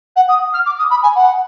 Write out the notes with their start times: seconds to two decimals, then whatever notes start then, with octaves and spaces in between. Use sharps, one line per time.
0.15 F#5
0.28 D#6
0.53 F6
0.65 D6
0.78 D#6
0.90 B5
1.02 G#5
1.15 F#5